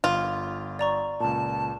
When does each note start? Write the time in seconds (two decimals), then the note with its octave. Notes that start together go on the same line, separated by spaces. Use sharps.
0.04 G1 F4
0.79 D5 A#5 C#6
1.20 C#2 A#2 A5